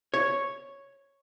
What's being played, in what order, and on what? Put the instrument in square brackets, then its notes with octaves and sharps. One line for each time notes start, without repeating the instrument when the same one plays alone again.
[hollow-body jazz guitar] C#5